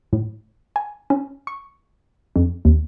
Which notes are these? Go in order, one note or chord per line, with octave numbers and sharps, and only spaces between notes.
A2
G#5
C#4
C#6
F2
D#2